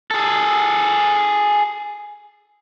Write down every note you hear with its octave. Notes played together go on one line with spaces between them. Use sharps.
G#4 A4